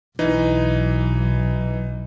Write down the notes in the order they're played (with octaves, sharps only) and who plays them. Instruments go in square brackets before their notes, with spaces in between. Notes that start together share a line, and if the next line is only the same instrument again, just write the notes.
[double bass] B1 [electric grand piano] E3 D#4